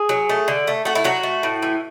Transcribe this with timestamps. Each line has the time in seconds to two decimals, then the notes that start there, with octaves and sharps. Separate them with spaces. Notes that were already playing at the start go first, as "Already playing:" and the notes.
Already playing: G#4
0.09 F#3
0.29 A3
0.48 D3
0.67 A3
0.85 A3 F#4
0.95 E4
1.04 F#3 F#4
1.23 A3
1.43 A2
1.62 E3